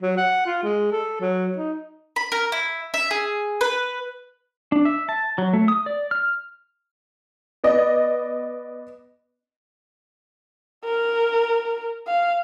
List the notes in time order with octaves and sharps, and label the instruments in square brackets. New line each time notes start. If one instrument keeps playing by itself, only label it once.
[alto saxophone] F#3
F#5
F4
G#3
A4
F#3
D#4
[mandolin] B5
A#4
E4
E5
G#4
B4
[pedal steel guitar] D4
E5
A5
F#3
A3
D#6
D5
F6
[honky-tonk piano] B3 D5 D#5
[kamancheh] A#4
F5